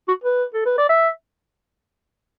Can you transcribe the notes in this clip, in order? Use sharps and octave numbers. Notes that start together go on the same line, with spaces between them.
F#4
B4
A4
B4
D5
E5